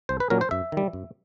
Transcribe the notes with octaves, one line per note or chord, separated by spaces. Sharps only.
C2 C5
B4
A#2 F#3 A#3 C#4 A#4
C5
F#2 E5
D#3 G3
F#2